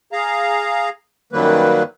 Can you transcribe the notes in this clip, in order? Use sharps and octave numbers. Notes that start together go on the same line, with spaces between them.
G#4 F5 A#5
F#2 D#3 F#3 G3 A#3 B4